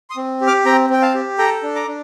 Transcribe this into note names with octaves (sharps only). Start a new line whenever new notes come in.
C6 D#6
C4
G4
D6 F6
C4 G5 A#5
C4 G5
F5 A5
G4
A4 G5 A#5
D4
A#5 D6
D4